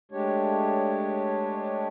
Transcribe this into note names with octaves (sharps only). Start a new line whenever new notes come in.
G#3 A3 D4 G4 C#5